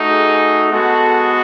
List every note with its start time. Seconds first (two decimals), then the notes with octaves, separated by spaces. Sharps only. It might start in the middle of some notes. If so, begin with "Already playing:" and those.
Already playing: A3 D#4 F#4
0.09 G#4
0.71 G#3 B3 F#4 A4